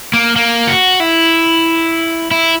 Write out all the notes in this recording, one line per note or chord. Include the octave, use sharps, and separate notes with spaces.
A#3
A#3
F#4
E4
E4